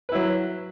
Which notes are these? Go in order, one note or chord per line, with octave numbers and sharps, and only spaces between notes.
F#3 E4 B4